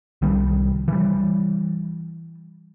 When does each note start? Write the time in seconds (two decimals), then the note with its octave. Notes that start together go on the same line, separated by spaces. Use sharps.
0.22 C2 D#3 G3
0.88 E3 G3